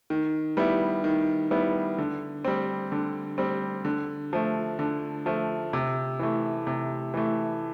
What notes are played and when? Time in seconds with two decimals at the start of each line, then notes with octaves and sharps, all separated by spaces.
0.10 D#3
0.57 G3 B3 E4
1.04 D#3
1.51 G3 B3 E4
1.98 D3
2.45 G3 C4
2.92 D3
3.38 G3 C4
3.85 D3
4.33 F3 A3
4.79 D3
5.26 F3 A3
5.73 C3
6.19 E3 A3
6.67 C3
7.14 E3 A3